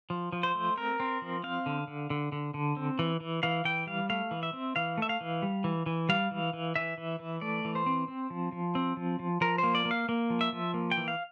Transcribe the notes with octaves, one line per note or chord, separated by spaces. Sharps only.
F3
F3
C5
A3
C4 A#4
C4
F3
C4 F5
D3
D3
D3
D3
D3
C4
E3
E3
E3 F5
E3 G5
G3 F5
A3 F5
E3
E5
C4
E3 F5
A3 E5
F5
E3
G3
E3
E3
G3 F5
E3
E3
E3 E5
E3
E3
A3 D5
E3
C5
C4
C4
F3
F3
C4
F3
F3
F3 A#4
A#3 C5
D5
A#3
F5
A#3
F3
E5
F3
A#3
G5
E3
F5